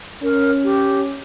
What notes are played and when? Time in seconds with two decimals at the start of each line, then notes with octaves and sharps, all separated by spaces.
0.23 C#4 A#4
0.64 G4